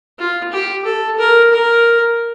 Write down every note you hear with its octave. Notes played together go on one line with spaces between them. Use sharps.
F4
G4
A4
A#4
A#4